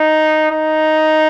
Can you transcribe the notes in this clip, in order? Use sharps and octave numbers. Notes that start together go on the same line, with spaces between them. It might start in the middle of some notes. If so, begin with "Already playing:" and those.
Already playing: D#4
D#4